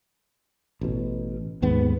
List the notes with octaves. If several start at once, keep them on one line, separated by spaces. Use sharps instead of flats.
A1 B2
D#2 G#2 B3